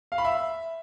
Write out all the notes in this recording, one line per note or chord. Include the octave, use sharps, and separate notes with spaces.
F5
B5
E5